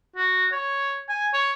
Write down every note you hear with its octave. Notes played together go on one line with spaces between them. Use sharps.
F#4
C#5
G#5
C#5